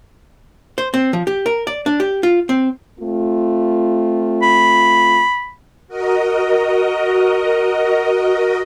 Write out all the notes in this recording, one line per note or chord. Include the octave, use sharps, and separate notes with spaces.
C5
C4
F3
G4
A#4
D5
D4
G4
F4
C4
A3 C4 F4
B5
F#4 A#4 D#5